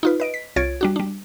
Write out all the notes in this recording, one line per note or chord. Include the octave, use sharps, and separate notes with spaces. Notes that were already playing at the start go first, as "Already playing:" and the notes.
D#4 F4 B4
B4 D#5 D7
B6
C2 F4 C#5 G#6 A6 D7
G3 D4 F#4
G3 D4